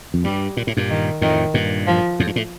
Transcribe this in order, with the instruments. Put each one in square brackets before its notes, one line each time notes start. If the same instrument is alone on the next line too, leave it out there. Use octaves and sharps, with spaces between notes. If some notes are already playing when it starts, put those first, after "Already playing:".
[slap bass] F2
[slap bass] G2 [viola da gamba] G3
[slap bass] A#2
A2
G2 A#2
[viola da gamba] D#3
[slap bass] F2 A2 [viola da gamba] D#3
[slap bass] G2 A#2
[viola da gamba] F3
[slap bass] F2 A2
G2
A2